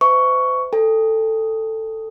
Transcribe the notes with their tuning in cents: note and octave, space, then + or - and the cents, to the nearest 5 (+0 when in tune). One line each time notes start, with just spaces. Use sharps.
C5 -45 E5 -15 C#6 +10
A4 +10 G5 +40